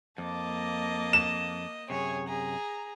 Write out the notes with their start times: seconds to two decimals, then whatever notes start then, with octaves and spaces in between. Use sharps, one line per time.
0.18 F2 A#3 D#5 A5 D6
1.13 E7
1.90 F#2 C3 G#4 C#5
2.27 G#4 A#5